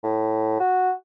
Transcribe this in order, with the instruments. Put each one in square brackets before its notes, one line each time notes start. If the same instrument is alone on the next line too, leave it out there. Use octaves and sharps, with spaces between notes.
[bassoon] A2
F#4